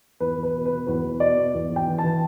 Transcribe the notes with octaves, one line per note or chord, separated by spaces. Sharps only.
E2 B4
E2
B4
B2
B4
B2
E2 B4
E2
B2 D5
B2
E2
E2
G5
E3
A5
E3